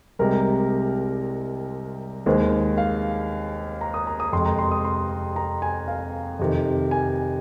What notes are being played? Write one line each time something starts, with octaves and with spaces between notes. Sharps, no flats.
C2 C3 G#3 A#4
D#2 D#3 G#3 C5
F5
A#5
D#6
A#5
D#6
F2 C3 G#3 C6
A#5
C6
D#6
C6
A#5
G#5
F5
F2 C3 D#3
G#5